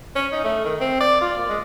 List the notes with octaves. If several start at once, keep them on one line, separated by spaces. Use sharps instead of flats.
C#4
D#4
A3
D#3
C4
D5
F4
A#2
G#3